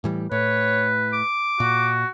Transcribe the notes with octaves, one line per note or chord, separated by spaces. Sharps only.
A2 E3 G3
A2 B4 C#5
D6
A#2 F#4